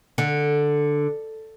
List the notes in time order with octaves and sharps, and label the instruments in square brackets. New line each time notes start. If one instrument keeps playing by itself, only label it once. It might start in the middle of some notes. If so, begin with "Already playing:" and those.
[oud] D3